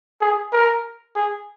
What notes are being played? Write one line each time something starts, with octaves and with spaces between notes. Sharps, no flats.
G#4
A#4
G#4